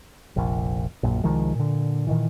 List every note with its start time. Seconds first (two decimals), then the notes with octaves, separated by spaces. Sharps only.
0.36 F1 A#1
1.03 A#1 F#2 A#2
1.24 C2 D#3 F3 G#3
1.55 A#2 D3
2.07 A#2 D#3 E3